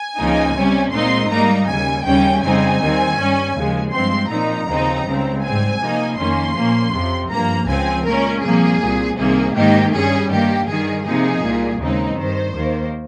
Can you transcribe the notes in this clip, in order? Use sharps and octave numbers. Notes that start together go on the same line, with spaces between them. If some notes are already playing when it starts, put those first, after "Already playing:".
Already playing: G#5
C#2 C#3 F3 A#3 D#4
C3 G3 C#4
A#2 G#3 C4 D#4 C6
G#2 G3 A#3 D#4 A#5
D#2 C#3 G3 G#5
D#2 C#3 G3 C#4 G5
F2 C#3 G3 C4 D#4 G#5
D#2 D#3 G3 C4
G2 G3 C#4
D#2 C#3 F3 G#3
G2 F3 G#3 C4 C6
A#2 F3 C4 D#4 A#5
D#2 C#3 F3 C4 D#4
C#2 C#3 G3 C4
G#2 G3 C4 G#5
C3 F3 A#3 D#4
F2 D#3 A#3 C#4 C6
A#2 F3 A#3 C#4
F2 C3 F3
G2 F3 A#3 A#5
C#2 C#3 F3 C4 G#5
A#2 G#3 C#4 A#4
C2 A#2 F3 A#3 G#4
C2 A#2 G3
C2 C3 D#3 A#3 G#4
G#2 D#3 A#3 D#4 G4
G2 G3 C#4 G#4
G2 D#3 A#3 G4
G2 D#3 G3 G#4
C3 F3 A#3 D#4 G#4
C2 A#2 G3 A#3
D#2 C#3 G#3 C4 D#4
G2 D#3 G3 C5
D#2 D#3 A#3